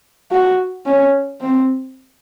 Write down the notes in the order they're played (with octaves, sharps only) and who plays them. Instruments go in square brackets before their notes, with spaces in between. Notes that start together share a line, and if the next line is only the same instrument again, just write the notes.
[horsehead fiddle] F#4
C#4
C4